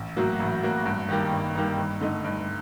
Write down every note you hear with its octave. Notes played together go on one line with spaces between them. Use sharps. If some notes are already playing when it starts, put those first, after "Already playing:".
Already playing: A1
A2 F#3 A#3 F#4
A1
A2 F#3 A#3 F#4
G2
D#3 G3 A#3
G2
D#3 G3 A#3
G2
D3 A3 D#4
G2